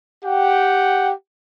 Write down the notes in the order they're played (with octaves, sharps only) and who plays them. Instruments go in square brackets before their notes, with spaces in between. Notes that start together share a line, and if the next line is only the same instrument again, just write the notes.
[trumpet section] G4 F#5 G5